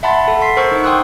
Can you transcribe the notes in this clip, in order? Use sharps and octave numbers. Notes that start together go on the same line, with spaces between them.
E5 F#5 A5 B5 C6 A6
A4
C6 B6 C7
A#4 C5 F#5 C#6 E6
D#4 C5
G5 C6 D#6 E6 F#6